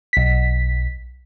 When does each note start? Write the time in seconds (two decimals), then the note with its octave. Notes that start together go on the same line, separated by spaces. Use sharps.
0.13 B1 B6